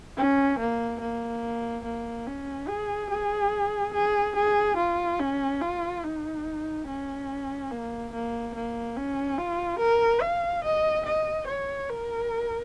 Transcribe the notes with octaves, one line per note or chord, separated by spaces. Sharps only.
C#4
A#3
A#3
A#3
C#4
G#4
G#4
G#4
G#4
F4
C#4
F4
D#4
C#4
A#3
A#3
A#3
C#4
F4
A#4
F5
D#5
D#5
C#5
A#4